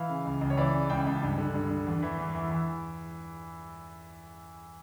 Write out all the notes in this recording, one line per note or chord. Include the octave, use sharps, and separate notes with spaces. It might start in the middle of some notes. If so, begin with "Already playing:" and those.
Already playing: E3 F5
C#3
C#2
C#2
C#5
E3 D5
C#3
C#2 G5
C#2
G2
D3
G2
D3
E2
E3
E2
E3
E3